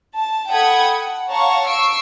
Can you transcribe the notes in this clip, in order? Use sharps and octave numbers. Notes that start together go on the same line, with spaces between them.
A5
A4 F#5 G5 B5 D#6 G#6
F#5
C#5 F5 F#5 A5 A#5 C#6
C#6 E6 C7 D7